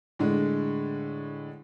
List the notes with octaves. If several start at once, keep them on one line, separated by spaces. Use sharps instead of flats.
A2 D3 G#3